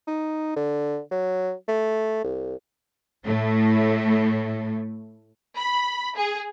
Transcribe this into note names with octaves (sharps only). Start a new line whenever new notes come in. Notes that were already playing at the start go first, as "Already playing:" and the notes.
D#4
D3
F#3
A3
C2
A2 A3
B5
G#4